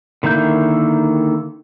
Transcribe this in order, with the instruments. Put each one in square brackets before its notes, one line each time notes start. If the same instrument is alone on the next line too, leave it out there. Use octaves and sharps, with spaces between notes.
[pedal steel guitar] D3 D#3 A#3 E4 G6